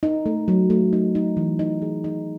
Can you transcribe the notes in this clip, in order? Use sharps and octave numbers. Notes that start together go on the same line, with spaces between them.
D#4
A3
F#3
A3
D#4
D#4
E3
D#4
G#4
D#4